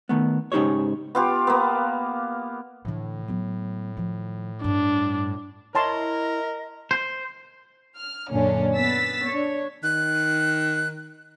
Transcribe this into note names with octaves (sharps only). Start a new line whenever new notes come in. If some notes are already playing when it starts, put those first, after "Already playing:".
D#3 A3 B3
G#2 C#3 D#4 G4 C5 C#5
B3 F4 G4
A#3 B3
A2 D3 E3
F#3 B3
D#3 F3
G2 D4
E4 A#4 C#5 D#5 A5 C6
C5
F6
F#2 A#2 D3 C#4 D4
B3 E6 A6 B6
D4 C#5
D#3 F#6